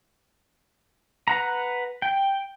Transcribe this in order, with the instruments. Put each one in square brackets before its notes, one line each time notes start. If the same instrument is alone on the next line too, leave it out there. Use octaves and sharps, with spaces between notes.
[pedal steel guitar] B4 F#5 A#5
G5